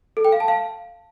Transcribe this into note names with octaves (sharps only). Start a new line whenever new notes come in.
A4
G5
F5
A5
F5